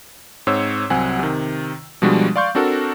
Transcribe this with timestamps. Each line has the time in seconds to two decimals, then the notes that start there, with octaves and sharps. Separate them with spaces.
0.47 G#2 C4 C#5 E6
0.90 C2 F#3 C4 F#5 G#5
1.19 C3 D#3
2.02 B2 F3 G3 G#3 D4 F#4
2.36 D5 F5 C6 C#6 G6
2.55 C4 D4 F#4 A4 A#4